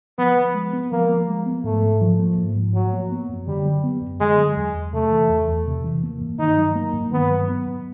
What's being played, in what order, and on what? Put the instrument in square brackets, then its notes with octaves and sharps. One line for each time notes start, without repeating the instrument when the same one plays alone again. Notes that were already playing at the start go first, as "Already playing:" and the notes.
[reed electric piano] F3 [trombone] B3
[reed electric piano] F3
G#3
B3
[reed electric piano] F3 [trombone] A#3
[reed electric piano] F3
G#3
B3
[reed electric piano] G#2 [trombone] A3
[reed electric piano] G#2
F3
A#3
G#2
G#2
[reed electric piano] F3 [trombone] F#3
[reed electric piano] A#3
B3
F#2
[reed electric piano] D3 [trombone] G3
[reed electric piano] F#3
B3
F#2
[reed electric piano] D3 [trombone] G#3
[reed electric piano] F#3
E2
E2
[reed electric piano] C3 [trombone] A3
[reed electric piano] E3
E2
E2
C3
E3
A#3
G2
[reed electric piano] D#3 [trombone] D#4
[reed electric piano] F#3
A#3
G2
[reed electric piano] D#3 [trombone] B3
[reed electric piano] F#3
B3
G2